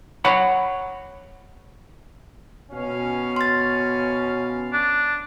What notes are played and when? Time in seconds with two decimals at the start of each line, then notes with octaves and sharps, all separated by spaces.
0.25 C#5 F#5 B5
2.72 B2 C#4 F5
3.36 C6 A6
4.73 D4